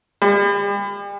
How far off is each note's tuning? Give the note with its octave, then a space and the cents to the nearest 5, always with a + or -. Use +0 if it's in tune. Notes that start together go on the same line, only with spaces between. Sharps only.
G3 +45